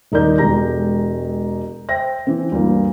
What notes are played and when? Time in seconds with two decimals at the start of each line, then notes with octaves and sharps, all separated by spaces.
0.12 D#1 D#4 A#4 D5 G6
0.38 E1 G#3 A3 G4 A#5 A#6
1.89 C5 E5 G5 A#6
2.27 E3 C4
2.52 D2 G2 A#3